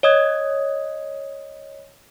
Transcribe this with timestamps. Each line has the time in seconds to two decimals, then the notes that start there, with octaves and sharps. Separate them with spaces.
0.03 C#5 D#5 D#6 G#6